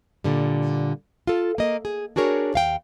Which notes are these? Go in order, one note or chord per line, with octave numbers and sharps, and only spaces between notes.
A#2 D3 G3
F4 A4
A#3 D#5
G#4
D4 F#4 G#4 A#4 C#5
D#2 F5 G5